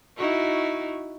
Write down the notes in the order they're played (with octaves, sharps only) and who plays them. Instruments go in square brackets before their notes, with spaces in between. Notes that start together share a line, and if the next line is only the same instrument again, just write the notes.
[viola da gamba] D#4 E4 F#4